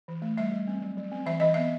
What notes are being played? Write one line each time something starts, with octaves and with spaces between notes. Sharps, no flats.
E3
A3
G3 E5
G3
C4
F#3
F#3
C4
E3 E5
E3 D#5
B3 E5